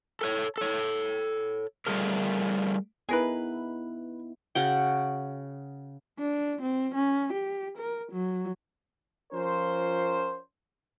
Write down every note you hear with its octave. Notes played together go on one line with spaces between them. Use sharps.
A4 A#4 C#5
A4 C#5
G3 A3 F4 G#4 A#4
B3 D#4 E4 G#4 A#4 B4
C#3 F#4 G5
D4
C4
C#4
G4
A#4
F#3
F3 C#4 F4 A#4 C5